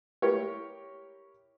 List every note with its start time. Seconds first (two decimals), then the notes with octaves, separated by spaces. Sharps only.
0.22 E4 G4 A#4 C#5